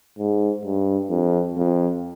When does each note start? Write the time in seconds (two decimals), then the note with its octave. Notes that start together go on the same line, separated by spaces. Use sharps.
0.19 G#2
0.65 G2
1.10 F2
1.57 F2